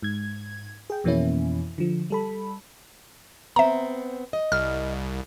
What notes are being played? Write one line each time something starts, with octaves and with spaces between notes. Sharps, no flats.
G#2 G#6
G#4 G5
F2 B2 E3 A#3 C#4 E4
D3 F3
G3 A4 B5
B3 C4 E5 A#5
D#5
C2 F6